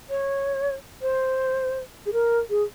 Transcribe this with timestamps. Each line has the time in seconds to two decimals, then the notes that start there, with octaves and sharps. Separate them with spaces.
0.10 C#5
1.02 C5
2.06 G#4
2.13 A#4
2.50 G#4